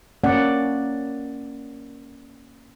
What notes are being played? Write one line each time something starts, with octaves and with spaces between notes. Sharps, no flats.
A#3 C#4 D5 F#5